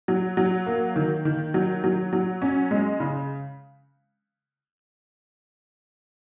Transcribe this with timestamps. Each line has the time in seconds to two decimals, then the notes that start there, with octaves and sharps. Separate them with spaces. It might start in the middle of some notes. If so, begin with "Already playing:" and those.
0.08 F#3
0.37 F#3
0.66 A#3
0.96 D#3
1.25 D#3
1.54 F#3
1.84 F#3
2.13 F#3
2.42 C#4
2.71 G#3
3.00 C#3